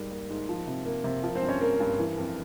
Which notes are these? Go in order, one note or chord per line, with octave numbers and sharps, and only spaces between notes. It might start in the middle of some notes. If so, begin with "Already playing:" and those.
Already playing: G#2 G3 A#4
A#3
G#2
F3
C3
A#3
C3
F3 A#4
C4 C5
G2
C#4 C#5
A#3 A#4
G2
E3
F2